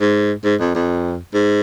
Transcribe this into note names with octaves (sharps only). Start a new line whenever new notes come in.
G#2
G#2
F2
F2
G#2